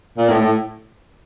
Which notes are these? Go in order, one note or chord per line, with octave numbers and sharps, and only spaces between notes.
A#2
A2
A2